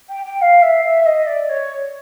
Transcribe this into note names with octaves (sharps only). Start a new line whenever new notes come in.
G5
G5
F5
E5
E5
D#5
D5
C#5